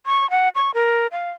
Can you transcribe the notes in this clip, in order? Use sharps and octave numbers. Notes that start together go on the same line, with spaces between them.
C#6
F#5
C#6
A#4
F5